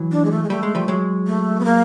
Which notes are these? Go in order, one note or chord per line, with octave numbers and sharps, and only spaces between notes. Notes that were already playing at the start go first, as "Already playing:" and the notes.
Already playing: E3 F#3
D4
G#3
A3
G#3
G3 A3
G#3
F3 G3
F#3 G#3
A3
B3
A#3